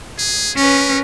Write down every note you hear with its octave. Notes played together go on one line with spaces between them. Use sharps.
G#4
C#4 A#4 B4